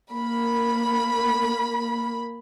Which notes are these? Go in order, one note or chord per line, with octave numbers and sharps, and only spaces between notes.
A#3 B5